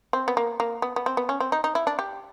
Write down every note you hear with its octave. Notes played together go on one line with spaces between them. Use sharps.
C4
B3
A#3
A#3
B3
B3
C4
B3
C#4
C4
D#4
D#4
E4
D4
G4